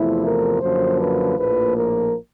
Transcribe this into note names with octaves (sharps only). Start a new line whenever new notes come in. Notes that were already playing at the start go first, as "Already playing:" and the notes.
Already playing: E2 C3 F3 A3 E4
A#4
F#2 D3 F3 A#3 C5
B4
A#1 A2 F3 A#3 B4
A#4